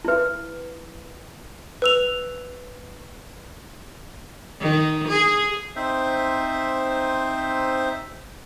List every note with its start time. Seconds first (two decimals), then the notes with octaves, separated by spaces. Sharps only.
0.05 E4 B4
1.82 B4 E6 F7
4.61 D#3
5.08 G#4
5.76 C4 D#4 C5 E5